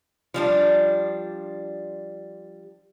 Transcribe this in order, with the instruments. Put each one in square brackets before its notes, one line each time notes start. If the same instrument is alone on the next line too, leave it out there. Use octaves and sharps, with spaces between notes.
[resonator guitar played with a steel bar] F3 G3 D4